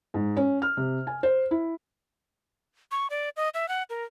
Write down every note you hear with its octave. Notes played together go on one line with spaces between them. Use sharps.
G#2
C#4
F6
C3
G#5
C5
E4
C#6
D5
D#5
E5
F#5
A#4